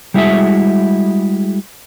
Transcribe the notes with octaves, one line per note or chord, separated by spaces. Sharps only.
G3 G#3 E4 F#4 G#4 E5